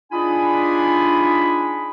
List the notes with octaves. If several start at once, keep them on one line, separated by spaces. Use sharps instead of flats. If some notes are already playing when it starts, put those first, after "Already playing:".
D4 D#4 F4 G#4 G#5 B5